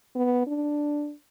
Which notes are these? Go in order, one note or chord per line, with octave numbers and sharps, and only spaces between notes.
B3
D4